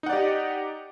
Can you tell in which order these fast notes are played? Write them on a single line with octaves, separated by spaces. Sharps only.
D#4 F#5 D5 G4 D#5